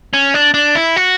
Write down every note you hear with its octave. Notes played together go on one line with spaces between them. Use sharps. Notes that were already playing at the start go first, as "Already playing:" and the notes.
C#4
D4
D4
E4
F#4